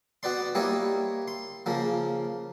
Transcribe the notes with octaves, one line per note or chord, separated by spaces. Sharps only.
B3 F#4 B4 D5 C6
G3 A#3 E4 C#5 D#5
C6
C#3 F3 A#3